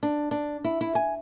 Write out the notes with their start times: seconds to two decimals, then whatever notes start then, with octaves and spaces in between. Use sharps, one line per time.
0.03 D4
0.31 D4
0.64 E4
0.81 E4
0.95 G#5